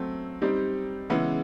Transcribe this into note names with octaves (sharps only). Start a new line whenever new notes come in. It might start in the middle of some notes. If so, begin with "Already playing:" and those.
Already playing: F#3 A3 C4
G3 C4 D#4 G4
C#3 E3 G#3 B3 E4